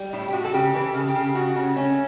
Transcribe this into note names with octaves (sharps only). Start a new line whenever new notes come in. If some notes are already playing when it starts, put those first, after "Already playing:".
Already playing: G3
A2 E4
G4
A2 F#4
A4
C#3 G4
E3 B4
A4
C#3 A4
G4
C#3
C#3 F#4
C#3
A3 C#4